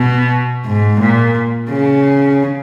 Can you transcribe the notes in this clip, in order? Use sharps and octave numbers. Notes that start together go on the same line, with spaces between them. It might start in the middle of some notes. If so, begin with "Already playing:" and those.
Already playing: B2
G#2
A#2
C#3